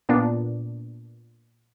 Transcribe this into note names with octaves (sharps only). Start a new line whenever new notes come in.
A#2 B3 D4